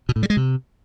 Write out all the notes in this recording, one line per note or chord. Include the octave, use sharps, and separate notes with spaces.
B2
A2
G3
G#3
C3